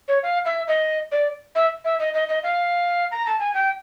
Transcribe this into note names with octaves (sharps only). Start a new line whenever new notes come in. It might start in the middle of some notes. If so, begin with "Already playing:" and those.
C#5
F5
E5
D#5
D5
E5
E5
D#5
D#5
D#5
F5
A#5
A5
G#5
G5